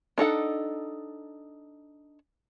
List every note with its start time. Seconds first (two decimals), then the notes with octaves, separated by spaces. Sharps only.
0.18 D4 D#4 A4 F#5